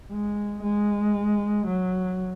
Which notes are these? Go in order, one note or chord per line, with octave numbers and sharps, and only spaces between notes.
G#3
G#3
F#3